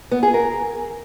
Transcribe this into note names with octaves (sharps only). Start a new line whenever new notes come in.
B3
G#4
A#4